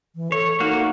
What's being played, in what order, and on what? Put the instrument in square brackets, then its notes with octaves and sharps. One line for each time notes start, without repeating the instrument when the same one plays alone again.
[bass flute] E3
[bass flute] A4 [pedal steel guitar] C#5
[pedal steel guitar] A#3 F#4 [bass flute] D#4